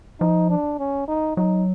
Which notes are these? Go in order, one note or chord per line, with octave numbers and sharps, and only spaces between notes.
F3 D#4
D4
C#4
D#4
F#3 D#4